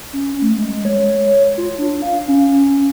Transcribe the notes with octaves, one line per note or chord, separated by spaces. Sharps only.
C#4
A3
G#3
C#5
F4
D4
F5
C#4